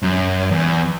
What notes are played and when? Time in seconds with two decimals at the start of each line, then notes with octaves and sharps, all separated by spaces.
0.03 F#2
0.51 E2